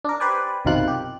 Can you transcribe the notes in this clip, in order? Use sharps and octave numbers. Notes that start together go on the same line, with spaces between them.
D4 A#4
G4 B4 C5 D5 G#5
B1 F#2 C3 D#3 F4 F#6
G4